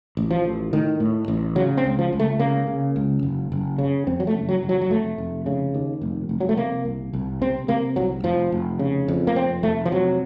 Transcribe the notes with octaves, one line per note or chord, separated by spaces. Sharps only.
A1
F3
A1
A2 D#3
A2
A1
C#3 F#3
C4
C#2
F3
C#2
A3
C#3 A#3
C#3
C#2
F#1
F#1
C#3
F2 C4
F#3
A3
F#1
F#3
F#1
F#3
F#3
F1 A3
F1
C#3
D#2
F1
F1
F#3
A3
C3 A#3
C2
C2
C3 C4
C3 A#3
C2 F#3
F1 F3
F1
C#3
F2
A#3
F1 C4
F1 A3
F3
C3 F#3